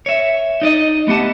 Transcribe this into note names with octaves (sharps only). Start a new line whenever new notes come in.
C#5 E5
D#4 D5 D#5
A3 B3 G4 F#5 A5